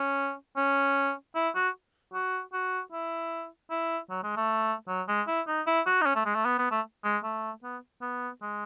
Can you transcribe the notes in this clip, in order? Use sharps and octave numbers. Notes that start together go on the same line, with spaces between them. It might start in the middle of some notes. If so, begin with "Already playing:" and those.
Already playing: C#4
C#4
E4
F#4
F#4
F#4
E4
E4
F#3
G#3
A3
F#3
G#3
E4
D#4
E4
F#4
D#4
C#4
A3
G#3
A3
B3
B3
A3
G#3
A3
B3
B3
G#3